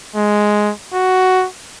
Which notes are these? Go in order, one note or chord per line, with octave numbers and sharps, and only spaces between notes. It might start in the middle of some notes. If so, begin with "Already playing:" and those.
G#3
F#4